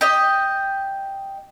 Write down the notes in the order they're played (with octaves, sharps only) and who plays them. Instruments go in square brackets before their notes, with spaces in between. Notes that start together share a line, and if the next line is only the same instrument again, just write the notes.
[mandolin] G4 D#5